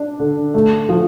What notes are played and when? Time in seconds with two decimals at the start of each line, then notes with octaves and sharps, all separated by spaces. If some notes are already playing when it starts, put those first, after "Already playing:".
Already playing: D4
0.19 D3
0.54 A3
0.89 F3